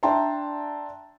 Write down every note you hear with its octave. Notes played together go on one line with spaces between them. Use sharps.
D4 E5 G5 A5 A#5 C6